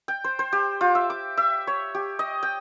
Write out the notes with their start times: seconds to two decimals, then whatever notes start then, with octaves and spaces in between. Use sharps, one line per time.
0.08 G5
0.24 C5
0.39 C5
0.53 G4
0.81 F4
0.95 E5
1.10 D6
1.37 E5
1.67 C#5
1.95 G4
2.19 D#5
2.43 G5